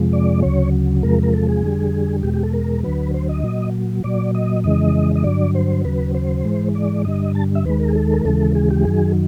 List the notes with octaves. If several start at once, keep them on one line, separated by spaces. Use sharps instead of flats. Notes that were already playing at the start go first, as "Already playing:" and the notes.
Already playing: F2 C3 F3 G#3
D5
D2 C#3 F#3 C#5
E2 C3 F3 G#3 A#4
A#4
A4
G#4
F2 D3 G3
E2 B2 G#3 G4
G4
A4
A#4
D2 D3 F#3 B4
C5
D#5
A#2 F#3
A#2 F#3 D5
D#5
F2 C#3 E3 G#3 D#5
D#5
G2 D3 F#3 D5
C5
D#2 C#3 F#3 B4
C5
G#2 E3 G#3
D5
G2 D3 G3 D#5
A5
E5
D#2 D#3 G#3 B4
A#4
G#4
A4
A#4
D#2 C#3 E3 G#3 A4
G#4
G4
F#2 D#3 F#3 G#4